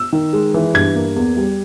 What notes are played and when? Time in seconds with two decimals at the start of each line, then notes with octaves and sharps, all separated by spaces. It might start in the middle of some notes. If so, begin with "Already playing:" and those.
Already playing: E6
0.13 D#3
0.33 G#3
0.54 E3
0.74 G2 G#6
0.95 A#3
1.16 E2
1.37 G3